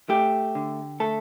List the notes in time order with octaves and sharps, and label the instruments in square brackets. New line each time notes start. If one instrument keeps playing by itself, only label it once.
[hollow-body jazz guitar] A3 G4
D3
A3 A4